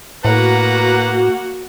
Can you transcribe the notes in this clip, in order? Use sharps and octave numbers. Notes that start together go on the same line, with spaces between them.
A2 A#3 F#4 B4 F#5 A#5